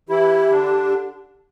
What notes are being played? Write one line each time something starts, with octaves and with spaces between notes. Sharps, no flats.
E3 E4 G4
D3 D4